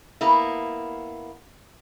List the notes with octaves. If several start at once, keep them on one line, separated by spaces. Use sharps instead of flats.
A#3 B3 E4